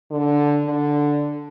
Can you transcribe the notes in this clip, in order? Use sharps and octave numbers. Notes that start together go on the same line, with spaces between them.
D3
D3